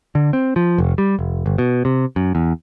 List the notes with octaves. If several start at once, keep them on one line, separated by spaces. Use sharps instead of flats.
D3
C4
F3
F1
G3
F1
G1
B2
C3
F#2
E2